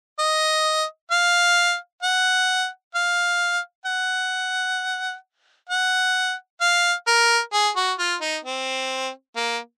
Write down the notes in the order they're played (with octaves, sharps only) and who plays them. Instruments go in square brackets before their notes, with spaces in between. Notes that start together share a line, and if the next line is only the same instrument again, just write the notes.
[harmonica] D#5
F5
F#5
F5
F#5
F#5
F5
A#4
G#4
F#4
F4
D#4
C4
A#3